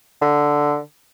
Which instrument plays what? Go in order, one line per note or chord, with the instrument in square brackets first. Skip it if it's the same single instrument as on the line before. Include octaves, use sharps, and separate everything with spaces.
[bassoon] D3